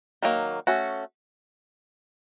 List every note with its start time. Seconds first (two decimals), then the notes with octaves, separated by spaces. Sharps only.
0.23 D#3 F#3 A#3
0.67 A3 C#4 F#4